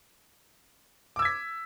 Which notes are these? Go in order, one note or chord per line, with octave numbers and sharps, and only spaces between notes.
D6 E6 G#6 B6